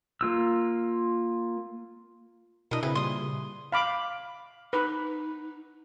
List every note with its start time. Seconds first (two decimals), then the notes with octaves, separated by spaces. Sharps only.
0.21 A#3 F4 E6
2.71 B2 A3 D4 E4 A#4 D#5
2.83 C#3 C4 E4 G#4 B4
2.95 A#2 G3 C6 D#6
3.72 F5 B5 D6
4.73 D#4 B4